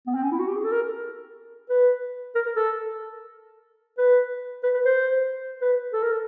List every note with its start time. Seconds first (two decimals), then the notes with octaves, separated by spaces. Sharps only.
0.07 B3
0.15 C4
0.23 C#4
0.32 E4
0.39 F#4
0.48 G4
0.56 G#4
0.64 A4
0.72 A#4
1.70 B4
2.35 A#4
2.46 A#4
2.56 A4
3.98 B4
4.63 B4
4.74 B4
4.85 C5
5.61 B4
5.93 A4
6.03 A#4
6.12 A4